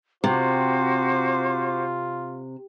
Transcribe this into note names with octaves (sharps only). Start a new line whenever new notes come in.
C3 F4 F#4 C5 D6